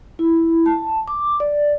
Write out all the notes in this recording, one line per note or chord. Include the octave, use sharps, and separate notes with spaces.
E4
A5
D6
D5